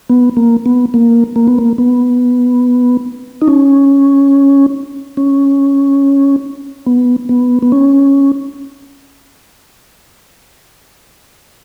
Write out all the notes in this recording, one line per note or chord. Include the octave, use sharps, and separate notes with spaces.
B3
A#3
B3
A#3
A#3
B3
A#3
B3
D#4
C#4
C#4
B3
B3
B3
C#4